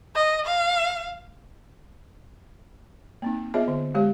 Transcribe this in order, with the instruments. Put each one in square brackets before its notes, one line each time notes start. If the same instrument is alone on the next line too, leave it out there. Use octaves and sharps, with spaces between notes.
[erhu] D#5
F5
[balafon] A#3 C4 D#4
B3 F4 G#4 C#5 D#5 E5
D3
G#3 G4 C#5